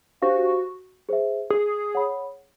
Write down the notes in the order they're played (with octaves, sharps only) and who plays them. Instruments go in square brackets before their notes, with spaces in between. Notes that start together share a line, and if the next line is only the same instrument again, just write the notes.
[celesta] D4 G4 C5 F5 [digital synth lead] F#4
[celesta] G#4 C5 E5
[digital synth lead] G#4
[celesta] C#5 F#5 B5